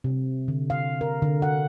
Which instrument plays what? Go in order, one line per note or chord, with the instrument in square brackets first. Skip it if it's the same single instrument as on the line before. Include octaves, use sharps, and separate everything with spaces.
[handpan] C3
D3
F5
A#4
D3
F#5